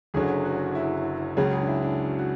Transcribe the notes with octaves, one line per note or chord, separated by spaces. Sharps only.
F#1 F#2 D3 F#3 G#4
F#4
E4
C#2 C#3 F#3 G#4
G#4
D4
E4
D4
F#4
F#4